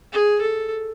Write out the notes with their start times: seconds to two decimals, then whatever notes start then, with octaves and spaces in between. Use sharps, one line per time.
0.12 G#4
0.41 A4